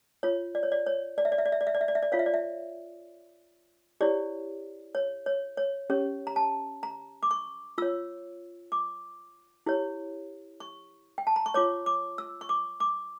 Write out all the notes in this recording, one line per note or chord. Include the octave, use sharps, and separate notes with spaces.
F4 C#5
D5
C#5
D5
C#5
D5
E5
D5
E5
D5
E5
D5
E5
D5
E5
D5
E5
D5
F4 C#5 F5
E5
D5
E5
E4 G4 C#5 D5
C#5
C#5
C#5
C#4 G4 C#5
A#5
A5
A#5
D6
C#6
F4 C#5 E6
D6
E4 G4 C#5
C#6
G5
A5
A#5
C#6
F4 C#5 D6
D6
E6
C#6
D6
D6